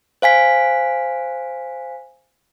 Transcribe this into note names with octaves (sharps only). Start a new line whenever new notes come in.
C5 F5 G#5 B6